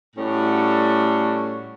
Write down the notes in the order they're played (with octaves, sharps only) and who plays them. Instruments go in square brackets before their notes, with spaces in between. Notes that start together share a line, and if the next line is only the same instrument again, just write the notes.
[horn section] A2 G3 C#4 F#4 A4